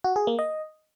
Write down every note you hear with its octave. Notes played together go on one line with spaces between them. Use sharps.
F#4
G#4
A#3
D#5